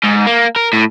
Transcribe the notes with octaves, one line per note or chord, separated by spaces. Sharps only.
G#2
A#3
A#4
A2